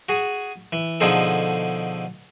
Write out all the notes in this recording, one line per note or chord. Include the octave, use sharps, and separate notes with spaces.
F#4 G#4
E3
B2 D3 F3 D#4 G#4 A4